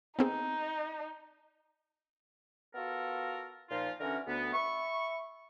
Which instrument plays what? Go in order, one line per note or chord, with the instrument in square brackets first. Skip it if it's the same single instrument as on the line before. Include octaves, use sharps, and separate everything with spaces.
[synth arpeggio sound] B3 C4 G#4 [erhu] D#4
[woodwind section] B3 F4 F#4 A4 A#4
A#2 F3 D#4 F4
D3 E3 C#4 F#4 A#4
D2 B3
E5 B5 C#6